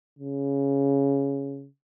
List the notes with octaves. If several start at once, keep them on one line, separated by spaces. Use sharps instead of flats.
C#3